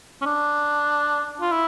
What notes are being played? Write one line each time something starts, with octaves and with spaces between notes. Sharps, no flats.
C#4
D4
F4
E4